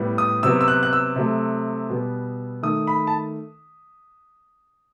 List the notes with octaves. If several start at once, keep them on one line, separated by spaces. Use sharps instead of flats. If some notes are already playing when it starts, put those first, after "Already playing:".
Already playing: A2 G3 B3
D#6
C3 F#3 B3 E6
E6
F#6
F#6
E6
C3 F#3 A3
B2 G3 B3
D#3 A3 D#6
B5
A5